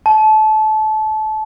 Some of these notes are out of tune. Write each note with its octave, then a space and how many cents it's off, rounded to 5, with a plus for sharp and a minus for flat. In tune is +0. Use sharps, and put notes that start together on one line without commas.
A5 -25